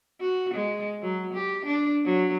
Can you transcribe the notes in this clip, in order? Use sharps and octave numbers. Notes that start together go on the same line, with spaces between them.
F#4
G#3
F#3
G4
D4
F#3